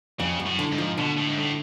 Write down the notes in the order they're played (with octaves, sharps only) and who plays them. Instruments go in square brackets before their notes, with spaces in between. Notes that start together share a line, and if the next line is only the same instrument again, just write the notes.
[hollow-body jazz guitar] F2 [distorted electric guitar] C#3
[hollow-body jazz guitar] F#2
[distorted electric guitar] A2
[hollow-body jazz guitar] D3
[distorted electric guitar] G#2
[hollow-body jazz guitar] F3
[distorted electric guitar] B2 [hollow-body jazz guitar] D3
[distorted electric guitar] A2
G#2
A2